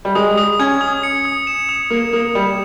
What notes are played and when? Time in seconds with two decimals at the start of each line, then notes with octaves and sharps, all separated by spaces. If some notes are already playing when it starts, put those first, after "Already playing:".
0.05 G3
0.15 G#3 D#6
0.37 D#6
0.59 C#4 G#6
0.81 D#6
1.03 C#7
1.25 D#6
1.47 E7
1.69 D#6
1.91 A#3 D#6
2.13 A#3 D#6
2.35 G3 E7